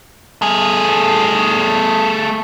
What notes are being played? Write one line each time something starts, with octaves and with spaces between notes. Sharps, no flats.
A3 G#4